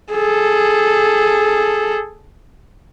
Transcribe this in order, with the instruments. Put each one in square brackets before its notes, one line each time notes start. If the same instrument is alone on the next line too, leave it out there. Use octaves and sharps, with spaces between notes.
[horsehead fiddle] G#4 A4